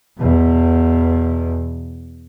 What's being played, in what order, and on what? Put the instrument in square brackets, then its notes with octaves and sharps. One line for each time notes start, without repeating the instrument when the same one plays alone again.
[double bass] E2 B2